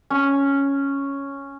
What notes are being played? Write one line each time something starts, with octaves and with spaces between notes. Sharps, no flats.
C#4